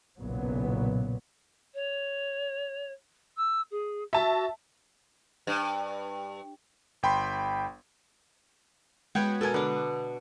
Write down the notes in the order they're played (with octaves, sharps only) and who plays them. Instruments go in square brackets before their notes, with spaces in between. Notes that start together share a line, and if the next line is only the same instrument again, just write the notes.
[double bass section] F#1 B1 A#2 F#3 B3
[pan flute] C#5
E6
G#4
[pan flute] F#4 [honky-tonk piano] E5 A5
[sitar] G2
[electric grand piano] G1 G5 B5 C6
[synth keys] G#3 F#4 [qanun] B3 B4 C#5 [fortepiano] F#5 G5
[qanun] B2 A#4 [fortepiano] A4 G#5
[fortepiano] D3 [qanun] B3 D4